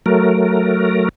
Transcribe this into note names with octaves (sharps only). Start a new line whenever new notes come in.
F#3 A3 A#4